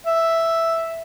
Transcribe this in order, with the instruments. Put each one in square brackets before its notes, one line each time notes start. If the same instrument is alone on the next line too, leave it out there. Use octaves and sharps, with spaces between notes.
[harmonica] E5